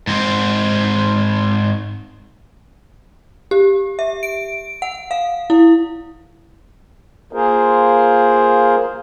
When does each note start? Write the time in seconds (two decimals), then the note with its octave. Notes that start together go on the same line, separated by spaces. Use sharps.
0.07 G#2 C4
3.51 G4
3.99 E5
4.23 D7
4.82 F#5
5.11 F5
5.50 E4
7.33 A#3 F4 G#4 A#4 C5